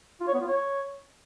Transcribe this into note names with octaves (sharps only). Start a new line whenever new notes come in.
F4
C#5
B3
F4
C#5